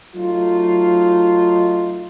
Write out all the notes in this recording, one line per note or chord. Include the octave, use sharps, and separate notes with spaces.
F#3 A3 D#4 F4